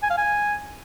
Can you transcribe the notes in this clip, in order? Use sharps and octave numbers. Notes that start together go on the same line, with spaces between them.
G#5
F5
G#5